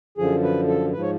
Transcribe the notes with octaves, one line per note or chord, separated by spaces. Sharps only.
F#2 D3 F3 G#4
B4
A4
G#2 F3 B4
C#5